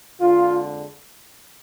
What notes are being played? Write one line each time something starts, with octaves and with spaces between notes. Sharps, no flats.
F2 D3 G#3 F4